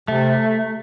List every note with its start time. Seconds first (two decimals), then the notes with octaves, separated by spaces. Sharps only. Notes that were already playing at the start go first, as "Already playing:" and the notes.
0.08 C3 A3